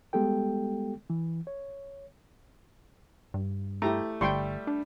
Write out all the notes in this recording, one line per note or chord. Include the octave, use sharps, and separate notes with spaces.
G3 G#3 B3 G4 A4 G5
E3
C#5
G2
A3 E4 G4 A#5
G1 G3 A3 G5 C6 C#6
D4